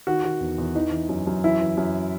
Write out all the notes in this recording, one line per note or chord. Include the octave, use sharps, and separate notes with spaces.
D#3 F#4
D#3
E2
E2
E3 D#4
E3
F#2
F#2
E3 E4
E3
F#2